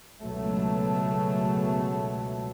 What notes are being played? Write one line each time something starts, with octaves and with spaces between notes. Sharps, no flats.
C#2 B2 F#3 A3